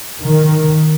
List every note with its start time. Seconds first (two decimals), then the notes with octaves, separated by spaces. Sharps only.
0.21 D#3